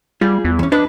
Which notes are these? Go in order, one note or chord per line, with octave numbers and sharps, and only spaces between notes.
G3 F4 G#4
E2
E3 C#4
D4 B4 D#5